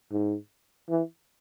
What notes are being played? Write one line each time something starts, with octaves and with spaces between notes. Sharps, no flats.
G#2
E3